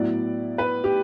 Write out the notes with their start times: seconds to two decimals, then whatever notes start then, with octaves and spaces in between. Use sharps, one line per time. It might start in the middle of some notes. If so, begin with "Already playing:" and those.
Already playing: A2 F#3 B3 E4 D5
0.58 B4
0.84 G4